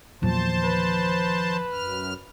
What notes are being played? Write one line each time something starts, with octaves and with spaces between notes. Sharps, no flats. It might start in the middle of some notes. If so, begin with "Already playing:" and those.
E2 A#2 D#3 F3 F#3 C5 A5
B4
F#2 F6